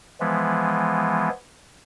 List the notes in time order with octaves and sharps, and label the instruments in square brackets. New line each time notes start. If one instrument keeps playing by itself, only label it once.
[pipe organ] E3 F3 G#3 B3